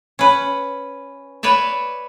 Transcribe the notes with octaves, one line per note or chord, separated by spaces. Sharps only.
C#4 B4
B4 C#5 D5 E5